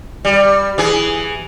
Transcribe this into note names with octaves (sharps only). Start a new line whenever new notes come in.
G3
E3 G#4